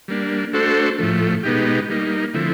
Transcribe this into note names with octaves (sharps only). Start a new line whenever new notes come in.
G3 A#3 D4
A3 D4 F#4 A4 C5
A2 F3 A3
B2 G#3 B3 D#4 G4
G3 A#3 D#4
D3 F3 A3 C4 E4